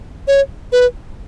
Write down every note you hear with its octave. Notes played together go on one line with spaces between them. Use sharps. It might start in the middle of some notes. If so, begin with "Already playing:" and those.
C#5
B4